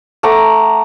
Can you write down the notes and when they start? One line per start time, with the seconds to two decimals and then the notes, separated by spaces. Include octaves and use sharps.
0.23 A3 F#5 A#5 D6